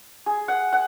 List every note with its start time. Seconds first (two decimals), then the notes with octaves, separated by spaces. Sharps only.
0.26 G#4
0.48 F#5
0.73 F#5